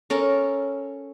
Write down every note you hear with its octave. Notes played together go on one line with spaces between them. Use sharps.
C#4 A4 A#4